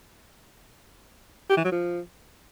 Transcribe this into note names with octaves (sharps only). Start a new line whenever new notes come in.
G4
E3
F#3
F3